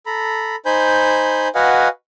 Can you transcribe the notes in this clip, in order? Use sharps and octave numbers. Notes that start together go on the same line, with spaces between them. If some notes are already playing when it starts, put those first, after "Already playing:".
A4 A#5 B5
D#4 C5 G#5 B5 G6
F#4 B4 D#5 F5 F#5 G#5